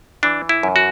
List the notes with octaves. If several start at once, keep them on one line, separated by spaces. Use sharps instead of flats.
E3 D4
E4
F#2
F#4